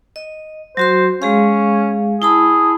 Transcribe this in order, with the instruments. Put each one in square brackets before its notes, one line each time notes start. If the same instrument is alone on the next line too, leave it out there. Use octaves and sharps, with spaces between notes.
[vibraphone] D#5
[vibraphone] F#3 F#4 C6 [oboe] C5
[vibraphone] G#3 G#4 F5 [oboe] C#4
[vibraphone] E4 A5 B5 [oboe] G#4